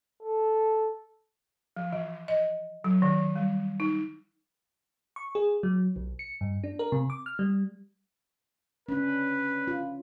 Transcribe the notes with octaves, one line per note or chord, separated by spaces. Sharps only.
A4
F3
E3
D#5
F#3
D#3
G3
D#4
C#6
G#4
F#3
B1
C#7
G2
D4
A#4
C3
D6
F6
G3
C#4 D4 B4
F4